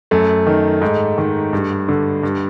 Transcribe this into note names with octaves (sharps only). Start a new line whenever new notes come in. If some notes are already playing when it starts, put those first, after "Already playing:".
F#2 A3
D#3
G#2
D#3
G2
D3
G2